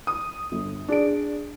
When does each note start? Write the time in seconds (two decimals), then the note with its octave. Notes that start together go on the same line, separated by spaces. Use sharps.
0.07 D#6
0.52 G1
0.88 D4 G#4 D5 D7